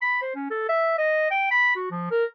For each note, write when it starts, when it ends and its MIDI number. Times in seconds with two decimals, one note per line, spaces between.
0.02 0.18 83
0.22 0.34 72
0.35 0.50 61
0.51 0.65 69
0.69 0.93 76
0.98 1.26 75
1.31 1.47 79
1.51 1.74 83
1.76 1.86 66
1.91 2.11 53
2.11 2.25 70